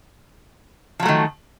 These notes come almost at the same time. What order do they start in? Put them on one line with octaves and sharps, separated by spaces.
F3 F#3 A3 D#3